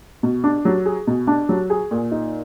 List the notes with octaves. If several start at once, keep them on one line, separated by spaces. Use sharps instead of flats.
B2
D4
F#3
G#4
B2
D4
F#3
G#4
A#2
D#4